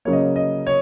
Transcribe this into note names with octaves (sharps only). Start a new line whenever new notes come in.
C#3 F#3 A#3 C#5
D#5
C#5
D#5
C#5